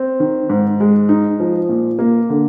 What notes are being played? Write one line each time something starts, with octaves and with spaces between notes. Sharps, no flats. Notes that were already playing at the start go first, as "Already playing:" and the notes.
Already playing: C4
D#3
G#2
G#3
D#4
F3
A#2
A#3
D3